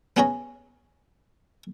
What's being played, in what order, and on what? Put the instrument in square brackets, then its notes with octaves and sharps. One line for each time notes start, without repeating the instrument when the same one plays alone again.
[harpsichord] B3 C#4 F#4 G#4 C#5 A#5